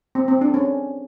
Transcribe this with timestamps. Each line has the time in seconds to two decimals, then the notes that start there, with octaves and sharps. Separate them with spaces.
0.15 C4
0.28 C4
0.41 D4
0.54 C#4